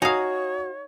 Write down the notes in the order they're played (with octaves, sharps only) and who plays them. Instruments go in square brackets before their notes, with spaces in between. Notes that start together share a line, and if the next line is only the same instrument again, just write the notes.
[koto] D#4 F5 [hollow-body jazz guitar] F#4 [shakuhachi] C#5 [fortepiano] G#5 A#5 D#6